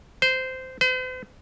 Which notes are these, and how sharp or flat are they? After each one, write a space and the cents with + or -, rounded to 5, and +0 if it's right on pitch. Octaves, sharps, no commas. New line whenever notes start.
C5 -15
C5 -45